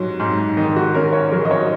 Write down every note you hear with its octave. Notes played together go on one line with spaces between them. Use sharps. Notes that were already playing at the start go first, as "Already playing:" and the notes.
Already playing: G#2 F#3
G#2
D#3 D#4
F#4
C#4 A#4
C#5
F#3 A#4
D#5
C#5